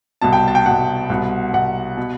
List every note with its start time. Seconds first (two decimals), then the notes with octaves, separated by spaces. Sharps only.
0.22 C2 B2 A5
0.33 G5
0.48 A5
0.55 G5
0.66 C2 B2 F#5
1.10 C2 B2
1.53 C2 B2 F#5
1.98 B2